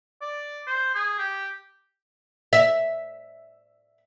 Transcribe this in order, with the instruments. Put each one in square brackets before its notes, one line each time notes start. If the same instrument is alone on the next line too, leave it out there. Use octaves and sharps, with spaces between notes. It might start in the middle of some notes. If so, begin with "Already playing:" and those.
[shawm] D5
C5
G#4
G4
[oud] E5